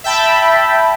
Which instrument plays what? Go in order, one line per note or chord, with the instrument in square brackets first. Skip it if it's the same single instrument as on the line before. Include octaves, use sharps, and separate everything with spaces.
[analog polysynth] E5 G5 A5 B5